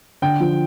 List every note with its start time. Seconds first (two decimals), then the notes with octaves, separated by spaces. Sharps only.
0.22 D3 G5
0.40 F3